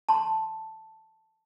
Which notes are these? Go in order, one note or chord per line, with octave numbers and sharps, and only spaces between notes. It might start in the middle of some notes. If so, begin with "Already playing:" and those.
A5 C6